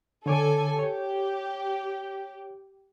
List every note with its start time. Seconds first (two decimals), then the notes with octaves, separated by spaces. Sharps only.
0.26 D3 A4 C#5 G#5 D6
0.79 G4 C#5